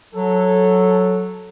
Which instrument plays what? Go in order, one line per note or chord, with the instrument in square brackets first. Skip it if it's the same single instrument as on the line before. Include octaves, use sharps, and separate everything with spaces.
[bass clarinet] F#3 [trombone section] A4